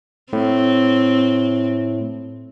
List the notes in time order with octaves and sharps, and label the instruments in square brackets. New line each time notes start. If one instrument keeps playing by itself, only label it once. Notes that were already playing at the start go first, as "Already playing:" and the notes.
[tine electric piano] A2 [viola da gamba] C4